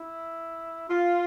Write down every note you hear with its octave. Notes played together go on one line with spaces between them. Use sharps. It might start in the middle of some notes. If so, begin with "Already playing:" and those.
Already playing: E4
F4